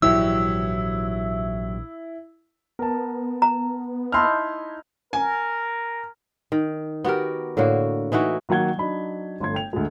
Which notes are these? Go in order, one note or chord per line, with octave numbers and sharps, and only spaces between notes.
A#1 G#2 E3 F#3 E4 G4 E6
B3 A#4 A5
A#5
D#4 E4 A5 C6 F6
A#4 G#5
D#3
B3 F#4 G4 A#4
A2 D3 A#3 F#4
E3 D#4 E4 F#4
D#3 F#3 A#3 F#5 G#6 G7
F#3 D4 D#4 B5
G1 A3 C6 G#6
G5 F7
D2 G#3